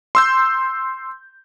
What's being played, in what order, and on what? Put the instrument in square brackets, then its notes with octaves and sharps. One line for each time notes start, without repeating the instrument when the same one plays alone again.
[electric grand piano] C6 E6 G6